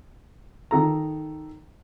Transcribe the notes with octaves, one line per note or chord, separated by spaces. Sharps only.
D#3 A4 A#5